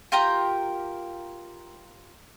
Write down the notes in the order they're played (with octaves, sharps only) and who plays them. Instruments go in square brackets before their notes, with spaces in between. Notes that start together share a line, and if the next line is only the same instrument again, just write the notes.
[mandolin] F4 G4 A#4 A#5